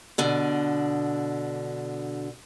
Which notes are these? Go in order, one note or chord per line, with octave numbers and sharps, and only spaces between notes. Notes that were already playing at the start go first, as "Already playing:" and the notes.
B2 D3